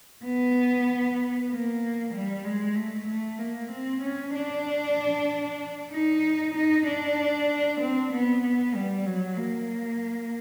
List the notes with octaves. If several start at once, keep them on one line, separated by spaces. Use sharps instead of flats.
B3
A#3
G3
G#3
A3
A3
A#3
C4
C#4
D4
D#4
D#4
D4
C4
B3
B3
G3
F#3
A#3